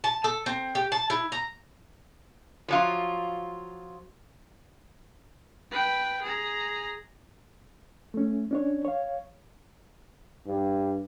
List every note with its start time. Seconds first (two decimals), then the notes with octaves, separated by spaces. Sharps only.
0.04 A5
0.24 A4
0.46 C4
0.75 G4
0.92 A5
1.10 E4
1.32 A#5
2.68 F3 F#3 F4
5.71 B4 G5
6.22 G#4 A#5
8.14 A3 C#4
8.51 C#4 D4 C#5
8.85 C#5 F5
10.47 G2